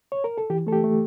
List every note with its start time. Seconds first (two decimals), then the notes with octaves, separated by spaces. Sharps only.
0.12 C#5
0.24 A#4
0.38 A4
0.50 E3 G4
0.67 A3 A4
0.72 G4
0.84 A3